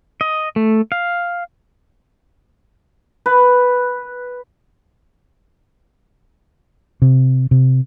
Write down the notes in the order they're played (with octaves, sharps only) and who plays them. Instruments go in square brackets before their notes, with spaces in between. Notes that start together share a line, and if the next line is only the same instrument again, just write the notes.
[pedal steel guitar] D#5
A3
F5
[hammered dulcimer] B4
[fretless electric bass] C3
C3